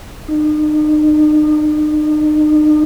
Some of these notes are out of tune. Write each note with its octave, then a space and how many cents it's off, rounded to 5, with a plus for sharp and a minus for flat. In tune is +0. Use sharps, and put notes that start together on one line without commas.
D#4 -40